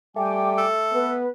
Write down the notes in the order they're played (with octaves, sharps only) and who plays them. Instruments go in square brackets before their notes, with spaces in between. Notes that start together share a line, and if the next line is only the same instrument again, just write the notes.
[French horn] G3 [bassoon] A3 [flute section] G5 G#5 D6
[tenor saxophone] A4
[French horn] B3 [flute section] B4